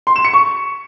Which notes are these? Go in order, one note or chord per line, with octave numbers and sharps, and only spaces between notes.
C6
E7
C#7
C#6